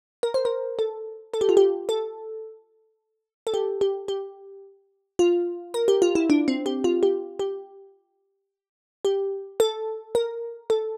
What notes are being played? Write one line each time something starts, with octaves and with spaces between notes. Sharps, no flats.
A#4
C5
A#4
A4
A4
G4
F4
G4
A4
A4
G4
G4
G4
F4
A#4
G4
F4
E4
D4
C4
G4
F4
G4
G4
G4
A4
A#4
A4